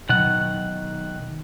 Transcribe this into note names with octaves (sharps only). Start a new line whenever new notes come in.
B2 D#3 F#3 F#5